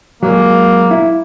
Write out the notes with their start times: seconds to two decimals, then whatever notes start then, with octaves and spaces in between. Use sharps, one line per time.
0.23 F#3 G#3 A#3
0.91 E4